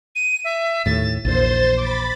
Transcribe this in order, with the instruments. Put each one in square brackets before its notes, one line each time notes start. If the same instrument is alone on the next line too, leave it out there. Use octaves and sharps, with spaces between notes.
[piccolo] D#7
E5
[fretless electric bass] D#2 A2 [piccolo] A6
[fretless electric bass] A#1 E2 A#2 [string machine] C5 [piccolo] A6
[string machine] B5 A6 [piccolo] D6